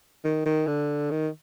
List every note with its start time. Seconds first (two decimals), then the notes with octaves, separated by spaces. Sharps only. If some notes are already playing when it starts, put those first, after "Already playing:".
0.25 D#3
0.46 D#3
0.67 D3
1.11 D#3